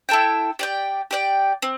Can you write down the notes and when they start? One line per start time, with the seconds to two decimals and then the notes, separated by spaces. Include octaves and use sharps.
0.09 E4 A4 E5 G5
0.59 G4 D5 G5
1.11 G4 D5 G5
1.62 C4